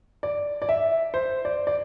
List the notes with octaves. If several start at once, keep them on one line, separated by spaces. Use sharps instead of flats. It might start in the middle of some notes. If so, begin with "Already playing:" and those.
D5
D5
E5
C5
D5
D5